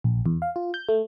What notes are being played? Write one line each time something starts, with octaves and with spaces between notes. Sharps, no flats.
A#1
E2
F5
F4
G6
A3